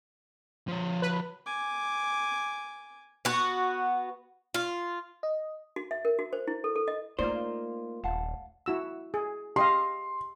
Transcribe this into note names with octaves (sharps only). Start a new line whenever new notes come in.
F3 C#5
B4
G#5 D6
B3 F#4
F4
D#5
F#4
E5
A#4
F#4
C5
E4
A4
A4
D#5
A3 A#3 D#4 F4 C5 D5
D#1 F5 F#5 A5
E4 F#4 E6
G#4
G4 D#5 F5 C6